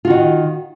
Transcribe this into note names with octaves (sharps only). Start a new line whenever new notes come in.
D#3 F4 F#4